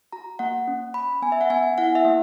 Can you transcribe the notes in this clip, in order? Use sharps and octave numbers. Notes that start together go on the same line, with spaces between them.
F#4 A#5
A#3 F#5
C#4
C#4 B5
B3 G#5
E5
F#5
B3 G#5
E4 F#5
E5
A#3